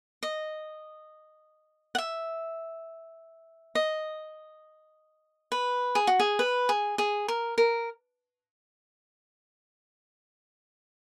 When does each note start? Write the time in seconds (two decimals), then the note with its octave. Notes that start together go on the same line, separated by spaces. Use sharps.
0.23 D#5
1.95 F#5
1.98 E5
3.75 D#5
5.52 B4
5.95 G#4
6.07 F#4
6.20 G#4
6.39 B4
6.69 G#4
6.98 G#4
7.28 A#4
7.58 A#4